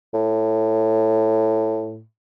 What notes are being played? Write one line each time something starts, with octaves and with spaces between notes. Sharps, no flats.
A2